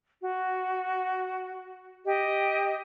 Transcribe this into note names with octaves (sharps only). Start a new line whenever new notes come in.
F#4
G4 D#5